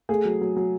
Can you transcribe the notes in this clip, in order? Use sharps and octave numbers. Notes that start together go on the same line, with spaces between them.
A3 G#4
F#3
F#3
F#3